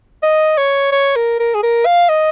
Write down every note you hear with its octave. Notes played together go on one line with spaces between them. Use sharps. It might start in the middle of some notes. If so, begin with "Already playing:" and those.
D#5
C#5
C#5
A#4
A#4
G#4
A#4
F5
D#5